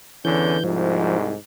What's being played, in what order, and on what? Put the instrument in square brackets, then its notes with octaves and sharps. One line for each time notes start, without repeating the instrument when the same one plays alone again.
[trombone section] E2 D3 C#4 [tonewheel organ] E3 G6
[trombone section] C2 G#2 [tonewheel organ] F3